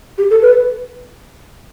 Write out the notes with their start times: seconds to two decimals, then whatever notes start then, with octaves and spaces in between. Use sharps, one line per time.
0.18 G4
0.30 A4
0.42 B4